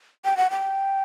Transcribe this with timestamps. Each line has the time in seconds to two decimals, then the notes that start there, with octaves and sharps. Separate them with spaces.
0.25 G5
0.37 F#5
0.51 G5